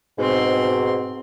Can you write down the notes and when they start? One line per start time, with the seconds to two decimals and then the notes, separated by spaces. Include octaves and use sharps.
0.19 G#2 B2 C4 C6